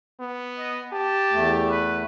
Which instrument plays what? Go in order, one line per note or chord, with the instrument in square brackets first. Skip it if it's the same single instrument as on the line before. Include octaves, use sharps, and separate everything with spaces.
[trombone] B3
[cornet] D#5
[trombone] G4 [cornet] A5
[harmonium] E2 A3
[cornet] B4